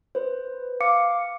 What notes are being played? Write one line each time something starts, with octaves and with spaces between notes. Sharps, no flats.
B4 C5
F5 D6 C#7